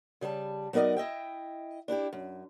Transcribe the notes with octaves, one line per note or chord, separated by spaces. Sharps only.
C#3 G3 F5 A5
F#3 B3 D#4 A#4 D5 D#5
E4 D#5 E5 G5
D4 E4 F#4 G4
F#2